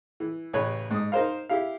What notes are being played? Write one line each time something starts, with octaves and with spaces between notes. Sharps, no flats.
E3
A1 C#3 B4 C#5
G#2 D#6
D#4 A#4 C5 F5
E4 G4 F5